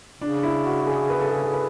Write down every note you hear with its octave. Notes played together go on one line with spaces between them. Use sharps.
C#3 D4
E4
F#4
G#4
B4
A4
G#4
A4
B4